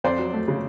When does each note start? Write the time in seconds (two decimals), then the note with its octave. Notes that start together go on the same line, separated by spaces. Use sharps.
0.04 F2 C5 D5
0.19 F#3
0.34 A3
0.48 C#3